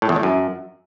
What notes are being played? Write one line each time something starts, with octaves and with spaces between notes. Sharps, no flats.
A2
E2
A2
F#2